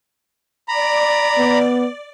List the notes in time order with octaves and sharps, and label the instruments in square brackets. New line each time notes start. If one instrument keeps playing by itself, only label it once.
[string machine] D5 [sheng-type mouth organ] A#5 B5
[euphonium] B3